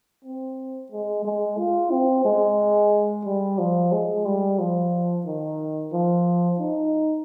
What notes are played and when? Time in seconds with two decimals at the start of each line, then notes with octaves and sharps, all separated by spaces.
0.25 C4
0.92 G#3
1.25 G#3
1.58 F4
1.91 C4
2.25 G#3
3.26 G3
3.59 F3
3.92 G#3
4.26 G3
4.59 F3
5.26 D#3
5.93 F3
6.60 D#4